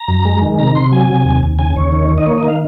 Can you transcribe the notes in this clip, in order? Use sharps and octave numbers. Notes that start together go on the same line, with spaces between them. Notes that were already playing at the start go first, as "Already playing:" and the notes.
Already playing: A#5
F#2
G#3
D#3
C3 A#5
C3 C6
F#3 G#5
C3
D#2
D#2
C#3 G#5
D#2 C#5
D#3
D#3
D#5
A#3 C#5
D#5
D#3
F5